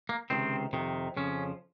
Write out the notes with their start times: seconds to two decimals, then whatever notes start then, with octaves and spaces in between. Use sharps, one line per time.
0.09 A#3
0.30 C#2 C3 D#3 C4
0.73 F2 C3 D#3
1.17 F2 C#3 F3 C#4